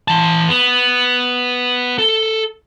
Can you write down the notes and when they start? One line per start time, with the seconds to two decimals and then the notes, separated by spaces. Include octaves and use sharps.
0.08 E3 A5
0.48 B3
1.98 A4